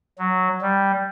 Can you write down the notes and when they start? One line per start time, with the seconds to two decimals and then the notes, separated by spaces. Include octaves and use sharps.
0.19 F#3
0.62 G3